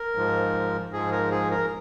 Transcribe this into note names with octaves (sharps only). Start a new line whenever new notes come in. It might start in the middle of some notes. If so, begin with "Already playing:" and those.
Already playing: A#4
G#2 F3
G#2 F3 G#4
A#4
G#4
A#4